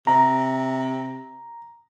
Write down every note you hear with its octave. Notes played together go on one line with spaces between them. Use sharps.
C3 A#5